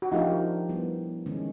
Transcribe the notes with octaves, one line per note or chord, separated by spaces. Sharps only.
F#4
F3 A3 D4 D#4 F4 G4 A#4
G3 B3 E4
D#3 G#3 C#4